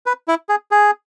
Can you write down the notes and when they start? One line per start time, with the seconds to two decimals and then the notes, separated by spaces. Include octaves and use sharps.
0.06 B4
0.28 E4
0.49 G#4
0.71 G#4